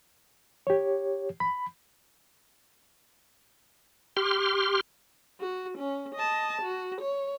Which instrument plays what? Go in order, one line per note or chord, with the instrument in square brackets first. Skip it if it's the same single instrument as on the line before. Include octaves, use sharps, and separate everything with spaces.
[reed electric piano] G4 C#5
B5
[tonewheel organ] G4 C6 F6
[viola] F#4
C#4
D#5 A5
F#4
C#5